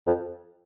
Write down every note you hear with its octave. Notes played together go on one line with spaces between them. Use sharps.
F2